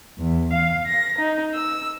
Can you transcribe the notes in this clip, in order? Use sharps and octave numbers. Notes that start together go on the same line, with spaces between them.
E2
F5
A#6
D#4
E6